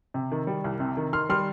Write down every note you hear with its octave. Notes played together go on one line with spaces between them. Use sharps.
C3
D#3
G3
C2
C3
D#3
D#3 C6 F6
G3 C6 F6